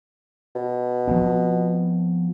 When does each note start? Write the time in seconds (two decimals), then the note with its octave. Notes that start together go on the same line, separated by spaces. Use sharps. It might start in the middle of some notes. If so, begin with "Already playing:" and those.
0.55 B2
1.08 F3 B3 C4